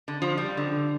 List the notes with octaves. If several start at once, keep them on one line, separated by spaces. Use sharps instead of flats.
D3
F3
G3
D3